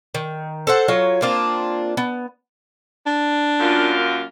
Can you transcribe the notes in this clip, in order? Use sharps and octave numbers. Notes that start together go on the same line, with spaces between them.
D#3
A4 C5 F#5
F#3 F4 C#5
A#3 C4 D4 F4
B3
D4
F#2 A#3 F4